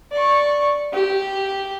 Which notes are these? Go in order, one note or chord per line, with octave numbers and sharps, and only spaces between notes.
D5 C#6
G4